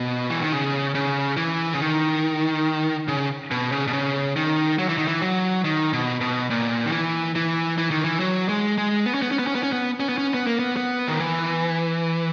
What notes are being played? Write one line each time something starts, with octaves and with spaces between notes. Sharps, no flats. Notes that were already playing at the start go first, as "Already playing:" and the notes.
Already playing: B2
E3
D#3
C#3
C#3
E3
C#3
D#3
C#3
B2
C#3
B2
C#3
D#3
F#3
E3
D#3
E3
F#3
D#3
B2
B2
A#2
D#3
E3
E3
E3
D#3
E3
F#3
G#3
G#3
B3
C#4
B3
C#4
B3
C#4
B3
C#4
B3
C#4
B3
C#4
B3
A#3
B3
B3
D#3
E3